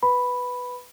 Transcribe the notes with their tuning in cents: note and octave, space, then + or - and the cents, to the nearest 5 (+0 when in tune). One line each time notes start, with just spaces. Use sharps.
B4 +0 B5 +0